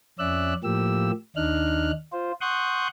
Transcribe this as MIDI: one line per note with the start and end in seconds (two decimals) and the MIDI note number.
0.19 0.54 41
0.19 0.54 61
0.19 0.54 74
0.19 0.54 76
0.19 0.54 88
0.19 0.54 90
0.64 1.11 45
0.64 1.11 53
0.64 1.11 58
0.64 1.11 67
0.64 1.11 88
1.36 1.92 39
1.36 1.92 62
1.36 1.92 63
1.36 1.92 89
1.36 1.92 90
2.12 2.32 65
2.12 2.32 72
2.41 2.88 78
2.41 2.88 84
2.41 2.88 85
2.41 2.88 87
2.41 2.88 90
2.41 2.88 91